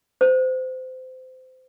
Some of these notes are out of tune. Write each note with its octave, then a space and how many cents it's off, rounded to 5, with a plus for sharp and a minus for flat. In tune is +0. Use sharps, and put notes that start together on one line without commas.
C5 -25